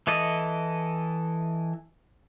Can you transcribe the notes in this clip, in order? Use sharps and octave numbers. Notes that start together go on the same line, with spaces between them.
E3 E4 A4 D#5